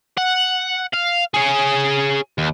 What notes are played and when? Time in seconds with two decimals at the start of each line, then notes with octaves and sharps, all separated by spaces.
0.18 F#5
0.94 F5
1.34 G#4 C#5
2.38 D#2